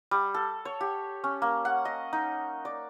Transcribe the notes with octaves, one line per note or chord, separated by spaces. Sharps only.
G3
A4
C#5
G4
C#4
A#3
F#5
D#5
D#4
D5